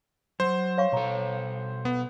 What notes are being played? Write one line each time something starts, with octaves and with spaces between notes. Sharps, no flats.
F#3 C5
C#5 F5 C#6
B2 A4 C#5 A#5
B3